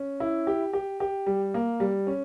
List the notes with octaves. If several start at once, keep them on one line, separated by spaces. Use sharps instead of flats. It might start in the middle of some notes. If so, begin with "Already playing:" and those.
Already playing: C#4
E4
G4
G4
G4
G3
A#3
G3
C#4